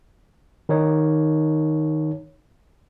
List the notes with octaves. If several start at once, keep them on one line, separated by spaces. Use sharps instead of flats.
D#3 D#4 C#5